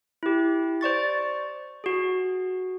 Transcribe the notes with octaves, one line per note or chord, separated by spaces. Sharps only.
E4 G4
C5 D5 C#6 A6
F#4 G#4